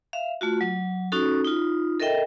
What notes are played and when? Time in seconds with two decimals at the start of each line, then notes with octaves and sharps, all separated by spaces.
0.13 E5 F5
0.41 A3 F4 F#4
0.61 F#3
1.12 C#4 D#4 F#4 A4
1.44 D#4 F4
1.99 A4 A#4 D#5 E5 G5